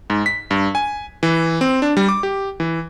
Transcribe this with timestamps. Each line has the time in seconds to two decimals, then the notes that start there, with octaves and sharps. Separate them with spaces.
0.10 G#2
0.26 B6
0.51 G2
0.75 G#5
1.23 E3
1.61 C4
1.82 D4
1.97 G3
2.08 D6
2.23 G4
2.60 E3